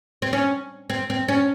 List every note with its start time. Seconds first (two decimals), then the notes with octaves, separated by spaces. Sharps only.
0.22 C4
0.33 C#4
0.90 C4
1.10 C4
1.28 C#4